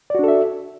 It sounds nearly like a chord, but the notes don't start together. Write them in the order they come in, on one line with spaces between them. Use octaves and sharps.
D5 F#4 D4 A4 E5